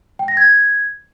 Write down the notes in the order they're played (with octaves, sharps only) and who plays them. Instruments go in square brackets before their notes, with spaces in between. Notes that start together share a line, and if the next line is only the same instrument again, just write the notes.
[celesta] G5
A#6
G#6